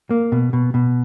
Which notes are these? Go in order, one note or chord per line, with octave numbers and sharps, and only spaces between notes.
A#3
B2
B2
B2